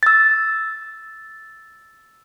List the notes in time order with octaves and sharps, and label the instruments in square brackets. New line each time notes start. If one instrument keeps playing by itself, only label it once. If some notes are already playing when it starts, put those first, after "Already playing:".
[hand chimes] E6 A6